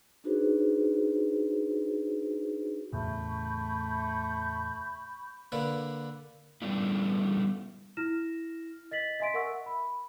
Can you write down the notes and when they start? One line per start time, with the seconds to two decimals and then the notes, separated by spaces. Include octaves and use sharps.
0.24 D4 D#4 F#4 G#4 B4 C5
2.93 E2 A2 C#3 A3 B5 C#6 G6
5.52 D3 A#3 B4
6.62 G3 A3 B3 C#4 D4 E4
7.97 E4 F6 A#6 E7
8.91 D#5 A6 B6 F#7
9.20 D#5 E5 G#5 C6 B6 D7
9.34 A#4 E5 F#5 C#6 E6
9.66 B5